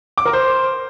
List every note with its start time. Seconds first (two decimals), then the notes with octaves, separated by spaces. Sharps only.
0.18 D6
0.25 A#4
0.33 C5